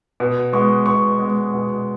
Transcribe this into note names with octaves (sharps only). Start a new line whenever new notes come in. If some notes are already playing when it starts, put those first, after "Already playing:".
B2
G#3 B3 C#6
B2 C#6
G#3 B3
B2